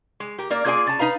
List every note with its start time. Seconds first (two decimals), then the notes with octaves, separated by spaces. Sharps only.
0.20 G#3
0.38 G4 A#4
0.50 A#3 A#4 D5
0.65 A#3 F4 G#4 D5 G5 G#5
0.87 C#3 A5
0.99 D#4 B4 F5 A#5